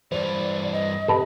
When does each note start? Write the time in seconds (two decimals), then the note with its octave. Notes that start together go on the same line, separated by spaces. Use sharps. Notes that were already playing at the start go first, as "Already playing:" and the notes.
0.12 G2 E3 C5 D5
0.72 D#5
1.08 C3 A4 B4